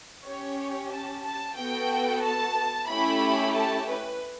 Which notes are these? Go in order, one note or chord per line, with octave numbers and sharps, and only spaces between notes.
C#4 G4 C#5
A5
A5
B3 F#4 A4 G5
A5
A3 C#4 E4 G4 B5
A5
B4